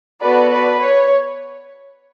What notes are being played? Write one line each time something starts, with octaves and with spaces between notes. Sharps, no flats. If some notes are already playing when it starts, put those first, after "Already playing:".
B3 F#4 A4 B4 D5
B4 D5
C#5